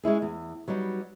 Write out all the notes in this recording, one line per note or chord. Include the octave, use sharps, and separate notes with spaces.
G#3 C#4 E4 G#4
E2
F#3 G3 B3 D#4